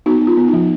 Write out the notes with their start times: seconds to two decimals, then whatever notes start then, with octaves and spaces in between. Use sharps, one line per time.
0.06 B3 D#4 F#4
0.21 B3
0.27 F4
0.37 B3
0.48 F3 D#4